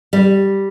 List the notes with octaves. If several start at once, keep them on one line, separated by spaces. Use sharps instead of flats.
G3